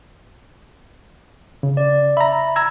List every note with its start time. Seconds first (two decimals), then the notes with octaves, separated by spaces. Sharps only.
1.63 C#3
1.77 D5
2.17 E5 A#5 B5
2.56 A#5 E6 G#6